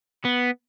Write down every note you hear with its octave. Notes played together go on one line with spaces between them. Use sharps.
B3